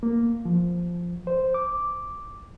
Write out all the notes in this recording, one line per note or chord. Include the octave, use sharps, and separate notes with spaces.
A#3
F3
C5
D6